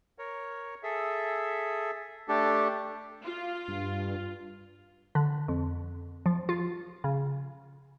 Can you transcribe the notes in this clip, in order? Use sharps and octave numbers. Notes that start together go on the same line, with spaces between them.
A#4 C#5
G#4 A4 E5
A3 D4 G4 A4
F4
G2
D3
F2
F3
F4
C#3